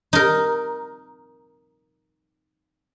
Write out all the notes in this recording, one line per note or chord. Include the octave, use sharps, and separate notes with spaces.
D#4 A#4